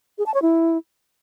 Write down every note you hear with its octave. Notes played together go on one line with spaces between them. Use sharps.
G#4
A5
C#5
E4